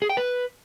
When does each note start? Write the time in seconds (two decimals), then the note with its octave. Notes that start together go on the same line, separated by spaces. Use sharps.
0.02 G#4
0.09 G5
0.17 B4